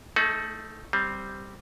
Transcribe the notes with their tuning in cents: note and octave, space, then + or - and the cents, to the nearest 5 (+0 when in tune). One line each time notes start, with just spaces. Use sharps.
A3 +0 D#4 +15 G#4 +45
G3 -5 C4 +0